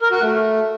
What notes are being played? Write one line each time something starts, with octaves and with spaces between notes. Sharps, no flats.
A#4
F#4
A3